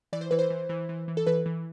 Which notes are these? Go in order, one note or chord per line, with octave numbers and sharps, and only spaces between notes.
E3 D5
C5
E3 B4
C5
E3
E3
E3
E3
A4
E3 B4
E3